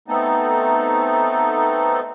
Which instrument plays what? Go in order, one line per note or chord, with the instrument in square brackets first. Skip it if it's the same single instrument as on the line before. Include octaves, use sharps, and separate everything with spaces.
[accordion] A3 B3 C4 D#4 A4